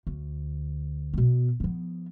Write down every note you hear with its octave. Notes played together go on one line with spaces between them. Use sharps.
D2
B2 B3
F3 B3